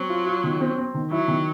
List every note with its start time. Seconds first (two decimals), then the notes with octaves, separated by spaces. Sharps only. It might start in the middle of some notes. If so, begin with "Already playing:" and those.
Already playing: F#3 C4
0.09 F4
0.26 F4
0.44 D#3
0.60 C4
0.77 C4
0.94 D#3
1.11 F#3 E4
1.28 D#3